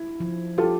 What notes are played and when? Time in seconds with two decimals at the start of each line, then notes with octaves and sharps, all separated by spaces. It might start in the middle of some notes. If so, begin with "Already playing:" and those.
Already playing: E4
0.20 F3
0.58 F4 G4 A4